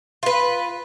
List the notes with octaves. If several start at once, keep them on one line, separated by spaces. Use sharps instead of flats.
F4 B4